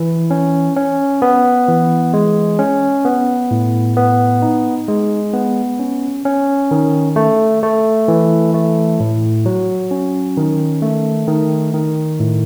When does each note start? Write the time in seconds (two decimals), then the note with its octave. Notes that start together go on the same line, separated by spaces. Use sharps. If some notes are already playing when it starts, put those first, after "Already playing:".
Already playing: E3
0.31 C#4
0.76 C#4
1.22 B3
1.68 E3
2.14 G#3
2.59 C#4
3.05 B3
3.51 A2
3.97 B3
4.42 D#4
4.88 G#3
5.34 B3
5.79 C#4
6.25 C#4
6.71 D#3
7.16 A3
7.63 A3
8.08 E3
8.54 A3
9.00 A2
9.46 F#3
9.91 C#4
10.37 D#3
10.82 A3
11.27 D#3
11.73 D#3
12.20 A2